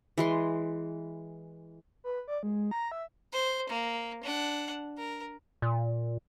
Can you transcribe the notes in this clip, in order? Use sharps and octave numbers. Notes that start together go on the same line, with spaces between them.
E3 G#3 C6
B4
D5
G#3
A#5
E5
C5
A#3
D4 F#5
A#4
A#2